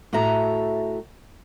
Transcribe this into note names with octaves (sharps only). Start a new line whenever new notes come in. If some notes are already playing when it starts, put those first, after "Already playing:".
A2 F#4 A4 E5 A#5